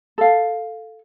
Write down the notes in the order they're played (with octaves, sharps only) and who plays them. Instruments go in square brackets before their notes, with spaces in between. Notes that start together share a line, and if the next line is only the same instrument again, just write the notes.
[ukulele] A4 F5